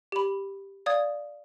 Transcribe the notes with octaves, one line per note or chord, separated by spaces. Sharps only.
G4 B5
D5 F5 D#6 G#6